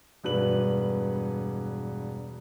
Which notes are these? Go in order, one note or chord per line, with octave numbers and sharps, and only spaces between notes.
E1 G2 B4 F#7